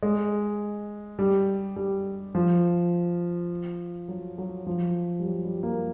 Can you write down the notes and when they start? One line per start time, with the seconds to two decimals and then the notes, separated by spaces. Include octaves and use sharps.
0.03 G#3
1.19 G3
1.76 G3
2.35 F3
4.08 F#3
4.38 F#3
4.67 F3
5.20 G3
5.25 F#3
5.44 G3
5.63 A#3